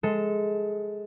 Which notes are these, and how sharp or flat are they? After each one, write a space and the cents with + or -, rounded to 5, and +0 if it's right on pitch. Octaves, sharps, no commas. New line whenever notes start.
G#3 +0 A4 +0 D#5 +35